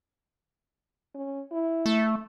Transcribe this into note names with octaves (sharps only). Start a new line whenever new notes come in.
C#4
E4
A3